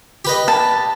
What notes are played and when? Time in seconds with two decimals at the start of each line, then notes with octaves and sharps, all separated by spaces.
0.25 G4 B4 D#5
0.48 A5